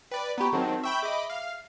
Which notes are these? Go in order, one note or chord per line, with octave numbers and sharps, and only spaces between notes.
B4 D5 G5
B3 G4 A#5 B5 C#6
D#3 F#3 C4 G#4 F#5 A5
E5 G5 B5 C#6
G#4 D#5 E5 B5 D6
F5